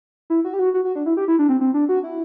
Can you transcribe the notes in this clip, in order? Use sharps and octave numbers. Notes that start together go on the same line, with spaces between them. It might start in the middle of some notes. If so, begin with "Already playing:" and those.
E4
F#4
G4
F#4
F#4
F#4
D4
E4
G4
E4
D4
C4
C4
D4
F#4
E4